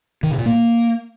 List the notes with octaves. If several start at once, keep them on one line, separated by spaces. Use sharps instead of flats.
D#3
B2
A#2
A#3